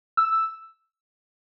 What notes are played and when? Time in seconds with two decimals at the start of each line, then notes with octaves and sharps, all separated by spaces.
0.17 E6